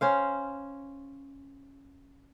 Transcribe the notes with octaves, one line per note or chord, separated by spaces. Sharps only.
C#4 C5 F5